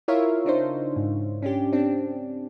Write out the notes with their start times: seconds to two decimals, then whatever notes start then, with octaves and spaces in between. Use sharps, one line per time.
0.08 E4 F4 A#4 C#5 E5 F5
0.45 C#3 D4 D#4 C5
0.96 G#2
1.42 C#4 D4 G4
1.72 C4 D4